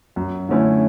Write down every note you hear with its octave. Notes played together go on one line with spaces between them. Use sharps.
F#2
D3 A3 C#4 E4